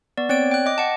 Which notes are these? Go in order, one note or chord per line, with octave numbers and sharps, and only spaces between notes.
B3 D5
C4 C#5 D5 D7
G5 F#6
D#5 D6
D#5 F#5 A5